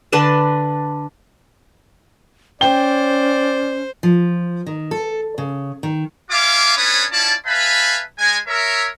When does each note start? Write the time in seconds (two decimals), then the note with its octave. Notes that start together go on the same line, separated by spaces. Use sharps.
0.12 D3 D4 B4 A5
2.61 C#4 C5 D5 G5 G7
4.03 F3
4.67 D#3
4.91 A4
5.38 C#3
5.83 D#3
6.31 F4 E5 F5 G#5 D6
6.77 C#4 D4 B4 C#5 B5 D#6
7.12 C#4 E4 F4 D5 A5
7.46 B4 E5 F5 G#5 A5 B5
8.18 G#3 G#5
8.47 A#4 C#5 E5